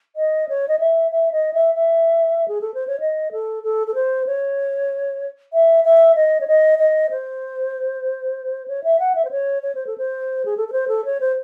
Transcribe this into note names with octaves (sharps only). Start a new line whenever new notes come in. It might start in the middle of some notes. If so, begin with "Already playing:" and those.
D#5
C#5
D#5
E5
E5
D#5
E5
E5
G#4
A4
C5
C#5
D#5
A4
A4
A4
C5
C#5
E5
E5
D#5
C#5
D#5
D#5
C5
C#5
E5
F#5
E5
C5
C#5
C#5
C5
A4
C5
G#4
A4
A4
C5
A4
C#5
C5